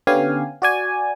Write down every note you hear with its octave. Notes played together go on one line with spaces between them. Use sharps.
D3 B3 C#4 G4 F5 G#5
F#4 D5 G#5